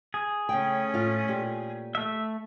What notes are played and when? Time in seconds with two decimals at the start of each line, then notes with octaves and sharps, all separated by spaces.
0.14 G#4
0.49 C#3 A3 C#4 G5
0.94 A2 F4
1.28 A#2 G4
1.95 A3 E5